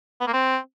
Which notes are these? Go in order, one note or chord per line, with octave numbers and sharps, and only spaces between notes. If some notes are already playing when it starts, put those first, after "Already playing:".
B3
A#3
C4